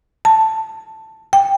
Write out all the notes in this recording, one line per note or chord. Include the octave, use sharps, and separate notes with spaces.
A5
G5